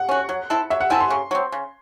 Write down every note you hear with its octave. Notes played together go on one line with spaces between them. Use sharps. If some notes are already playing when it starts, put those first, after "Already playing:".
Already playing: F#5
C#4 F#4
F#3
C4 E4 A4
F#3 E5
F#5
C4 E4 A4 G#5
C6
C#3
F#3 C4
C#3